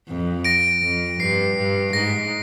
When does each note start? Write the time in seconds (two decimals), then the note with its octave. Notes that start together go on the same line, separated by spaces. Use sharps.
0.08 F2
0.45 A#6 D7
0.82 F2
1.19 G2 C7
1.57 G2
1.93 G#2 A#6